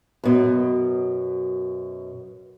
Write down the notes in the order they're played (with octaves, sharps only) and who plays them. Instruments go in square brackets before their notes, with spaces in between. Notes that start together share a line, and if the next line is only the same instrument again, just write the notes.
[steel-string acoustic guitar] F#2 B2